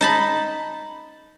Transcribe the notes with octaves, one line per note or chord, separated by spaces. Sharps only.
D#4 A5 B5